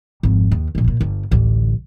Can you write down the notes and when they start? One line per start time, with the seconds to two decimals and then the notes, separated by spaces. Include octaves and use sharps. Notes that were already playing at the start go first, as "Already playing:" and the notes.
0.23 G#1 F2
0.52 D#2
0.75 F1 A#1
0.88 A#2
1.01 G1
1.31 A1 D2